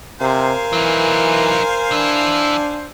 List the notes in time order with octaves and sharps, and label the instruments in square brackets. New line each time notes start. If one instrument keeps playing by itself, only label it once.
[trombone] C3 [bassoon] A#4 [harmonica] C5 F5 G#5
[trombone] E3 [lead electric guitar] F#3 D#4
[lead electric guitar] E3 E4 [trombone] D4